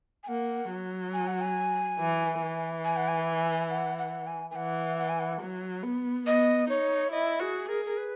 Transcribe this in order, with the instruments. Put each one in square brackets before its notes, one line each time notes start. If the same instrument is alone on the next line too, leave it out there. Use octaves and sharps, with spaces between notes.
[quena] G#5
[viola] A#3 [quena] F#5
[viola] F#3
[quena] G#5
F#5
G#5
[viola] E3
E3
[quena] G#5
F#5
G#5
F#5
F#5
G#5
G#5
[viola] E3 [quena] F#5
[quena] F#5
G#5
F#5
[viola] F#3
B3
[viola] B3 [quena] D#5
[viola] D#4 [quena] C#5
[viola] E4 [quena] D#5
[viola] F#4 [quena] G#4
[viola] G#4 [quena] A#4
[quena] A#4
B4